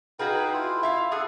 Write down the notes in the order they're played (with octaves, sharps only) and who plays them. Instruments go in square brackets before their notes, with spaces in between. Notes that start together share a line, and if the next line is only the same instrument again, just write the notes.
[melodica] D#4 F5 G5 [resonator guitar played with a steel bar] F#4 G#4 B4
[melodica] E4 F4
[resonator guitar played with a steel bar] E5 F5
[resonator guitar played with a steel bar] G#4 [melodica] A4 F#5